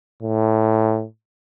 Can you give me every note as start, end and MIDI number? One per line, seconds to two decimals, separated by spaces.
0.22 1.05 45